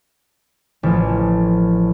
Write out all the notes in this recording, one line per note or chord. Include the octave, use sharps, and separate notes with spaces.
A1 F3